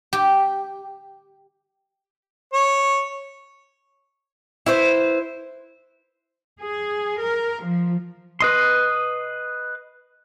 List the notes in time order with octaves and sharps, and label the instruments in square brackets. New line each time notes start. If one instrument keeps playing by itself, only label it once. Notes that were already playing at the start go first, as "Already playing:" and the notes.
[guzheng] G4
[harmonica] C#5
[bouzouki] E4 B4 C5
[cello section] G#4
A#4
F3
[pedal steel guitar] B4 D#5 C6